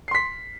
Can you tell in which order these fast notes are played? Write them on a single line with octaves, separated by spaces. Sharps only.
C7 C6 B6